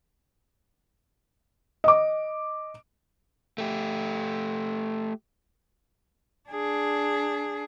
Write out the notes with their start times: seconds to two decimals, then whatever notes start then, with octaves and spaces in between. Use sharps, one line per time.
1.84 D#5 D6
3.58 A3 G4
6.49 D4 G#4